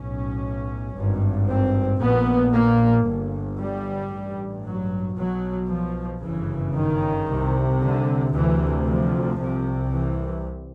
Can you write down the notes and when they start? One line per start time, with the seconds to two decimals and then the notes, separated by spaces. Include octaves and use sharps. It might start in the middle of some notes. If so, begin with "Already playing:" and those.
Already playing: B1 A2 C#4
0.95 G#1 G2
1.48 C4
2.00 A#1 A#2 B3
2.53 A#3
3.06 G1 G2
3.59 G3
4.12 A1 G2
4.65 F#3
5.17 B1 B2 F#3
5.70 F3
6.23 G1 F#2 C#3 E3
6.76 D#3
7.29 C2 C3
7.82 D3
8.34 D2 C3 E3
8.87 F3
9.40 C2 C3
9.92 E3